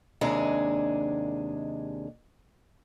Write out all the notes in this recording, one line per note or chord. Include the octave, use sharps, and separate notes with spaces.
D#2 C3 G#3 D4 G#4